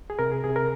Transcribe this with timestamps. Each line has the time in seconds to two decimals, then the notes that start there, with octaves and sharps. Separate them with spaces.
0.10 G#4
0.19 C3 A#4
0.32 G#4
0.44 C3 G#4
0.56 A#4